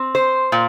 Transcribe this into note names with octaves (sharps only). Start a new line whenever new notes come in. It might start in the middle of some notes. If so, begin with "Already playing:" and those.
Already playing: C4
C5
A#2